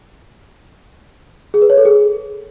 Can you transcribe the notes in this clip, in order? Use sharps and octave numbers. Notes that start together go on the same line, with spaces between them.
G#4
B4
C#5
A4
G#4